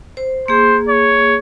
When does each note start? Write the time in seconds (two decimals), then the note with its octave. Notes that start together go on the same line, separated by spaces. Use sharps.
0.17 C5
0.48 A#3 G#4 C5
0.89 C#5